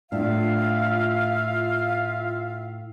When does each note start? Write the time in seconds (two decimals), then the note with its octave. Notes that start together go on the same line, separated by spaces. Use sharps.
0.12 A2 D4 F4 E5 F5